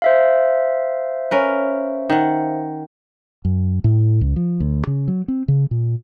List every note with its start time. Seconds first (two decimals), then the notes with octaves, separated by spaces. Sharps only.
0.02 C5 E5 F5
1.31 C#4 A#4 B4
2.10 D#3 F#5
3.45 F#2
3.84 A2
4.21 C#2
4.36 F3
4.60 D2
4.87 C#3
5.08 F#3
5.28 C4
5.48 C#3
5.71 A#2